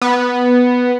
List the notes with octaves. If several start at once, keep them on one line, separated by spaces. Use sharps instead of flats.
B3